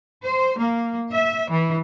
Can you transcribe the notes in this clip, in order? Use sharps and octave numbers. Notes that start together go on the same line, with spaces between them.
C5
A#3
E5
E3